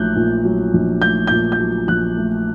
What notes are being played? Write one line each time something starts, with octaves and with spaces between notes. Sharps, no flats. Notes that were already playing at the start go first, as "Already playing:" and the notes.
Already playing: A#1 F#3 A3 F#6 G6
A#2
F#3
A#1
A3 G6
A#2 G6
G6
F#3
A#1 F#6
A3